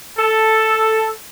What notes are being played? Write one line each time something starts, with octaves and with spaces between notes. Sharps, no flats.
A4